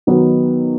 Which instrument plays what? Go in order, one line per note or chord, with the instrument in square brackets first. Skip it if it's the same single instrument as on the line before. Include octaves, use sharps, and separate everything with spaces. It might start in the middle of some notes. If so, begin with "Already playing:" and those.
[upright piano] D#3 F#3 B3 D#4 F#4